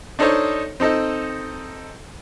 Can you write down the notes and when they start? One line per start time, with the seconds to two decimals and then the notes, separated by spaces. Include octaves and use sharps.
0.19 D4 D#4 A4 C5 C#5 D#5
0.80 C4 D#4 A4 D#5